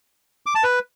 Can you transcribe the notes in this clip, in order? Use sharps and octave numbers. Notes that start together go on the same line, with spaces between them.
D6
A5
B4